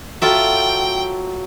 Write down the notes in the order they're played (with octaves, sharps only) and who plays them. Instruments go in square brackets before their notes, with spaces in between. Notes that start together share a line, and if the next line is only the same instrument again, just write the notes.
[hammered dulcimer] F#3 [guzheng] F4 A4 E5 [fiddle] G5